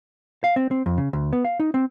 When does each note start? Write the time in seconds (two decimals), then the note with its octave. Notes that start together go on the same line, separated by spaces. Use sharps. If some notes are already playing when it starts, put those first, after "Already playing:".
0.44 F5
0.56 C4
0.71 C4
0.86 F2
0.98 C#3
1.13 D2
1.33 B3
1.45 F5
1.60 D#4
1.74 C4